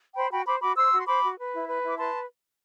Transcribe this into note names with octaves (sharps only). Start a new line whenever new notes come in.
C5 G5 B5
F#4 G5 B5
C5 B5 D6
F#4 B5 D6
C5 C6 E6
F#4
C6
C5 B5 D6
F#4
B4
E4
B4
E4
D6
B4 A5 C6